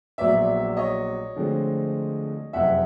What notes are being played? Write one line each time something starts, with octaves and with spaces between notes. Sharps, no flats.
A#1 A#2 F#3 B3 D5 E5
C#5 D#5
D2 D3 F3 G#3 C4
F#1 F2 C3 E5 F#5